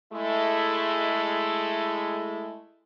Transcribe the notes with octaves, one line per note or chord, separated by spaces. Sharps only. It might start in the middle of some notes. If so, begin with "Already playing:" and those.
G#3 A3 E4